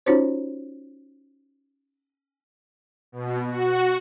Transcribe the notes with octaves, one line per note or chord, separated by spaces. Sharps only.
C#4 D#4 F4 F#4 C5 C#5
B2
F#4